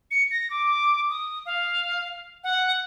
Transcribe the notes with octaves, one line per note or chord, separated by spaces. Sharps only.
C#7
A#6
D6
D#6
F5
F#5